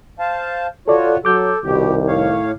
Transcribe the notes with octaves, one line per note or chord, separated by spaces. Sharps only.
C5 F5 A5
F4 F#4 A4 C#5 D5
F#3 A4 D6 G6
C2 B2 D#3 G4
A2 C#5 F5